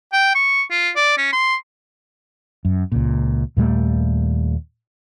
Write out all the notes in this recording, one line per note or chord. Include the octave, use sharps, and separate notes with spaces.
G5
C#6
F4
D5
C#4
C6
F#2
C#2 A#2
D#2 A#2 G3 A3